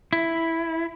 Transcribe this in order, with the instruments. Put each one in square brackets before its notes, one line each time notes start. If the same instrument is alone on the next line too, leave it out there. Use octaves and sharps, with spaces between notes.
[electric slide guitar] E4